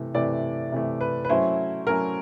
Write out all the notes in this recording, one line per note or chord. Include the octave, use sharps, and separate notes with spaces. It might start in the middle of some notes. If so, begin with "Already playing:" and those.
Already playing: C3 E3 A3
C3 E3 A3 D5
C3 E3 A3
B4
B4
F#3 A3 C#4 E4 C5
F#3 A3 C#4 E4 A#4